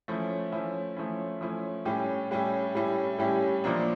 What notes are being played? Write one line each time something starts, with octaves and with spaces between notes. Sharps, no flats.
F3 A3 C#4 E4
F3 A3 C#4 E4
F3 A3 C#4 E4
F3 A3 C#4 E4
A2 G3 C#4 E4 G4
A2 G3 C#4 E4 G4
A2 G3 C#4 E4 G4
A2 G3 C#4 E4 G4
A#2 F3 A#3 D4